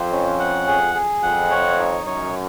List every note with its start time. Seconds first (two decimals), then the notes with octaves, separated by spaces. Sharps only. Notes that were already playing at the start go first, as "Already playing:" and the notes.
Already playing: F2 C5
0.12 C#4
0.39 F#5
0.67 G#4
0.95 G#4
1.23 F2 F#5
1.51 C#5
1.78 D#4
2.06 F#2 C#5